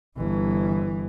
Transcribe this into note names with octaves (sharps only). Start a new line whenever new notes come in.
G1 E3